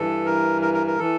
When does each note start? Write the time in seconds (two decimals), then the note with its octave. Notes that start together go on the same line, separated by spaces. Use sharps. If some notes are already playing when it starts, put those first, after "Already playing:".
Already playing: G2 E3 A4
0.26 A#4
0.62 A#4
0.74 A#4
0.87 A#4
0.99 E3 A4